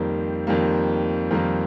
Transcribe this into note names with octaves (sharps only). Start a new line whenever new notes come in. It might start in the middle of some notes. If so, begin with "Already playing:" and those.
Already playing: F2 D#3 G3 A#3 C5
F2 D#3 G3 A#3
F2 D#3 G3 A#3 A#4